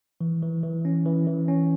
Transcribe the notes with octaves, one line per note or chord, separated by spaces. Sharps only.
E3
E3
E3
C#4
E3
E3
C#4